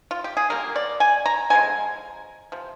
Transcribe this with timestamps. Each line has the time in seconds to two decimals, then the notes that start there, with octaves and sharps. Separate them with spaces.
0.11 F4
0.24 G4
0.37 G#4
0.50 D3 G3 A#3 A#4
0.76 D5
1.00 G#5
1.26 A#5
1.50 D3 F3 G#3 G#5
2.52 C3 F3